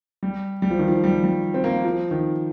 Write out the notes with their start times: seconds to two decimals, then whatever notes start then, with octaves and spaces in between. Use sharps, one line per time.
0.23 G3
0.62 G3
0.71 F3
0.79 D#3
0.88 F3
1.04 G3
1.24 G3
1.54 C4
1.64 A#3
1.85 F3
2.11 D#3